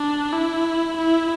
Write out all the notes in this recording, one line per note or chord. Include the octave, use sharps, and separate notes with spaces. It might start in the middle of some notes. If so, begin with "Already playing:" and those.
Already playing: D4
E4
E4